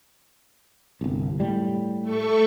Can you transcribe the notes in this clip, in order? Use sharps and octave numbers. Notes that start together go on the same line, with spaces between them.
G1 C2
A2 G3
A3 A4 C#6